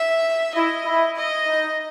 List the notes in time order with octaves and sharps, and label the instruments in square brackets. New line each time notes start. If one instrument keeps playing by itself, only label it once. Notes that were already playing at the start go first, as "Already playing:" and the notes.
Already playing: [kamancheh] E5
[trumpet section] E4 [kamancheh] D#5
[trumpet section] E4
[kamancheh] D#5
[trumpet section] D#4